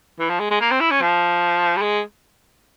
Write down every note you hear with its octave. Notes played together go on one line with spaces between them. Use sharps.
E3
F3
G#3
G#3
A#3
C4
E4
C#4
F3
G3
G#3